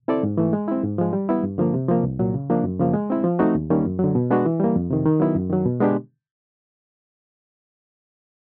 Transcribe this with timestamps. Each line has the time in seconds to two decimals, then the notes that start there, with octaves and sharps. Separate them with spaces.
0.08 C4 E4 A4 D5
0.23 G#2
0.37 E3 A3
0.53 G#3
0.68 C4 E4
0.84 G#2
0.98 F3 G#3
1.13 G3
1.29 B3 E4
1.43 G2
1.58 D3 F3 A#3
1.74 C3
1.88 F3 A#3
2.03 C2
2.19 A#2 F#3
2.34 C#3
2.50 F3 A#3 D4
2.64 F#2
2.80 C#3 F3 A#3
2.94 G#3
3.10 C4 E4
3.24 F3
3.39 A3 C4 D#4 F#4
3.55 D#2
3.70 D#3 G3 A#3 C#4
3.85 F#2
3.99 D3 F#3
4.15 B2
4.30 G#3 B3 D4 F#4
4.46 E3
4.60 G3 A#3
4.76 F2
4.91 C3 D#3
5.05 D#3
5.20 F#3 B3 E4
5.35 F#2
5.50 D#3 F#3
5.65 B2
5.81 G#3 B3 D4 G4